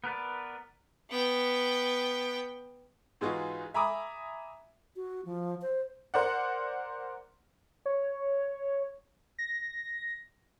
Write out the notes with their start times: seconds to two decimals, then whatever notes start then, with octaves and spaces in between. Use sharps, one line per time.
0.04 B3 A#4 B4 D5
1.10 B3 G5
3.21 G#2 E3 G#3 D#4 F4 F#4
3.74 E5 G#5 A#5 B5 D6 D#6
4.96 F#4
5.25 F3
5.62 C5
6.14 A#4 C5 D5 F#5
7.86 C#5
9.39 A#6